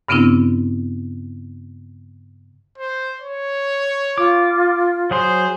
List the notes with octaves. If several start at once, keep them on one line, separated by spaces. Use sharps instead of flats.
G2 C#3 B3 C4 D4 E4
C5
C#5
F4 D6
F#3 G#4 C5 C6